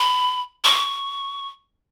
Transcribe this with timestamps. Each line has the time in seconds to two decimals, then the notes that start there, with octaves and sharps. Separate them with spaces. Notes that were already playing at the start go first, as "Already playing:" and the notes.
Already playing: B5
0.64 C#6